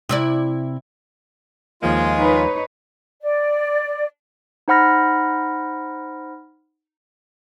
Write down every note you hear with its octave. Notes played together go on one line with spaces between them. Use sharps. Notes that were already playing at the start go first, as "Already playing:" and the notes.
C3 E4 D5
D#2 F3 G#3 A#3 F4
D#4 B4 C#5
D5
D#4 C5 F#5 B5 F6 A#6